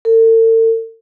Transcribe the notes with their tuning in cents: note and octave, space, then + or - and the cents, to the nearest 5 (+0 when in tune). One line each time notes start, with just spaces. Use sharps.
A4 +45